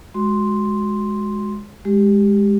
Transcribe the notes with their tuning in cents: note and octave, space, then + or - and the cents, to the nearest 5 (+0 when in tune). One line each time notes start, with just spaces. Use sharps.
G#3 +0 F#4 +0 C6 +0
G#3 -15 G4 +0